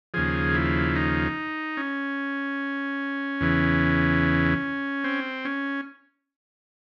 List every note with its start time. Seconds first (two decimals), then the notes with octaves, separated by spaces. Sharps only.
0.14 D#2 C#3 F3 G#4
0.55 E4
0.96 D#4
1.77 C#4
3.40 E2 C#3 E3
5.04 C4
5.45 C#4